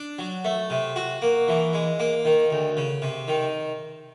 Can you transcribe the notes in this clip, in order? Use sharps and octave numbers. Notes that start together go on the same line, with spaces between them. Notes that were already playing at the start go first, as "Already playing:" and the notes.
Already playing: D4
F#3
A3
C3
F#4
A#3
E3
G#3
A#3
D#3
D2
C#3
C3
D#3